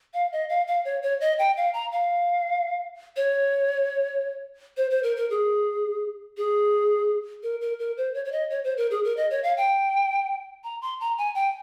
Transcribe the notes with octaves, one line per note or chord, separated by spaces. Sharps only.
F5
D#5
F5
F5
C#5
C#5
D#5
G5
F5
A#5
F5
C#5
C5
C5
A#4
A#4
G#4
G#4
A#4
A#4
A#4
C5
C#5
C#5
D#5
C#5
C5
A#4
G#4
A#4
D#5
C#5
F5
G5
A#5
C6
A#5
G#5
G5